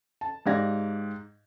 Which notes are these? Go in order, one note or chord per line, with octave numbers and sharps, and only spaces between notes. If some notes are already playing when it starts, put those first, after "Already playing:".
A5
G#2 G4 D5 F5 G#6 A#6